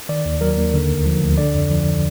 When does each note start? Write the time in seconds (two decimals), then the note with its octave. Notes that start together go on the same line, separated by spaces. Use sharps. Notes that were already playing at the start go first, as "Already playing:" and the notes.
0.09 D#3 D5
0.25 D#2
0.41 F#3 A#4
0.57 D#2
0.73 D3
0.90 D2
1.06 F3
1.22 D2
1.38 D3 D5
1.54 F2
1.70 F3